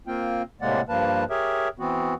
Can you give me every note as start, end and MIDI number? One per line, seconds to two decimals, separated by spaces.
0.07 0.42 58
0.07 0.42 60
0.07 0.42 65
0.07 0.42 79
0.61 0.81 45
0.61 0.81 48
0.61 0.81 56
0.61 0.81 58
0.61 0.81 74
0.61 0.81 78
0.89 1.24 43
0.89 1.24 53
0.89 1.24 58
0.89 1.24 71
0.89 1.24 81
1.30 1.68 67
1.30 1.68 68
1.30 1.68 70
1.30 1.68 73
1.30 1.68 76
1.80 2.14 52
1.80 2.14 59
1.80 2.14 60
1.80 2.14 66